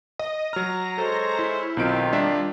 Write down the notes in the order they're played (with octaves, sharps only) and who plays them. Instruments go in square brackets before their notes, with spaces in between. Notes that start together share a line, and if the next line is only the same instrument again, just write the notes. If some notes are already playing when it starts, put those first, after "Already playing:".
[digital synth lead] D#5
[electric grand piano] F#3 F6 [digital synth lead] A#5
[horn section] G#3 C5 C#5 [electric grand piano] A4
[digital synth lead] E4
[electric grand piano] B1 C4 D7 [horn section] D#3 F4
[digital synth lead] G3 [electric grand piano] D4 E5